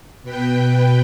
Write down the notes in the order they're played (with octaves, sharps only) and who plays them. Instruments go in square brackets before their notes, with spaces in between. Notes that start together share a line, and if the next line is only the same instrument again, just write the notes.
[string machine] B2 B4 G5